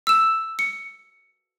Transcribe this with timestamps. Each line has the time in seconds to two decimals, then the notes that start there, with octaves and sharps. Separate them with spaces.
0.07 E6 E7
0.59 C#7